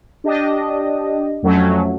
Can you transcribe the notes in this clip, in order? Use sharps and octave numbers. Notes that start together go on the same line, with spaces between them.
D4 G4 D#5
F2 F#3 A3 C#4